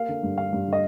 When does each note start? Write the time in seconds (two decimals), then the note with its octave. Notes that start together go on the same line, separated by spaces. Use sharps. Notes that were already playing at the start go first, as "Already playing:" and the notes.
Already playing: A#3 F5
0.09 D3
0.23 G2
0.38 D3 F5
0.53 G2
0.67 D3
0.73 D#5